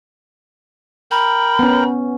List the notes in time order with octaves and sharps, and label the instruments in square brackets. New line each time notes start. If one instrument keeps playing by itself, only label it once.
[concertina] A#4 G5 [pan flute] B5
[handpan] B3 C#4